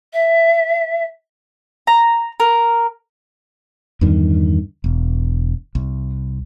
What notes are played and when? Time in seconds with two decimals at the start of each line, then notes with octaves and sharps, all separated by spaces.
0.13 E5
1.87 A#5
2.40 A#4
4.01 E2 G2 D3 D#3
4.84 E1
5.75 C2